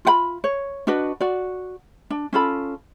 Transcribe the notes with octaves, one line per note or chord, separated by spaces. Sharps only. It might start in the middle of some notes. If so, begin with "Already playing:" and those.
F4 F#5 B5
C#5
D4 F#4 B4 D#5
F#4 D5
D4
C#4 F4 A4 B5